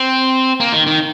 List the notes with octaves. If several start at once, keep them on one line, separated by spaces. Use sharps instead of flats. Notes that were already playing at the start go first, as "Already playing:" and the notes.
Already playing: C4
A#3
D#3
D#3